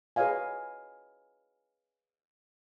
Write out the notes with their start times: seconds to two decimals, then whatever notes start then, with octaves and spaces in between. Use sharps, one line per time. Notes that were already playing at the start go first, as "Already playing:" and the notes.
0.16 G#4 B4 C#5 D#5 F5 G#5